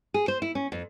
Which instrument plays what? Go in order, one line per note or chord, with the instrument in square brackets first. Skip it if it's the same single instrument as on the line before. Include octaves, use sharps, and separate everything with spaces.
[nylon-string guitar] G#4
C5
E4
C#4
F2